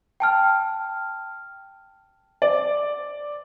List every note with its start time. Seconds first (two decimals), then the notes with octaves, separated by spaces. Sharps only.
0.20 G5 A5 F6
2.42 D5